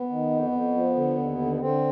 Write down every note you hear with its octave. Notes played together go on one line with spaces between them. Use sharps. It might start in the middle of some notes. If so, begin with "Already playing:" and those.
Already playing: B3
D#3
F2
F2
F3
D3
D#2
D3
B3
D3 C4